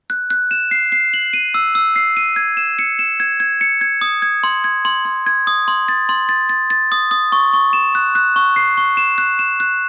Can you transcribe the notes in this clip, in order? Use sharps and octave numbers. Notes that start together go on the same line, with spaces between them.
F#6
F#6
E7
C7
C7
F#7
D#7
E6
E6
C7
D#7
G#6
E7
C#7
E7
G#6
G#6
C#7
G#6
D#6
G#6
C6
G#6
C6
C6
G#6
D#6
C6
A6
C6
A6
A6
A6
D#6
D#6
C#6
C#6
E7
F#6
F#6
C#6
C7
C#6
E7
F#6
E7
F#6